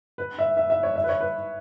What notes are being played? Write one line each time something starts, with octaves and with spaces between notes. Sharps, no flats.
B4
E5
E5
E5
C#5
E5
B4
C#5
B4